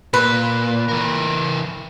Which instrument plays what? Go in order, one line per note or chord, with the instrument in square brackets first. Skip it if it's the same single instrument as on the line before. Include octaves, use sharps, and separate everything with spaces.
[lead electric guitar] A#2 [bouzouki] B4
[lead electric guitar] E3 A#4